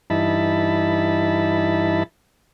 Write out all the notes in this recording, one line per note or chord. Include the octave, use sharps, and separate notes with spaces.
G2 E3 D#4 E4 A5 B5